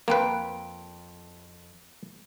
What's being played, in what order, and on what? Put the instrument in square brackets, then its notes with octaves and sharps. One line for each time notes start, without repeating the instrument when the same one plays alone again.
[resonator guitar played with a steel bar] F2 G5 [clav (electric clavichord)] A#3 B4